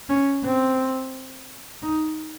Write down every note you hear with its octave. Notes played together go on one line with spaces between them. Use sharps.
C#4
C4
D#4